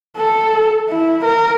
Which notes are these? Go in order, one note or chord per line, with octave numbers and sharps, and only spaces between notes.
A4
E4
A#4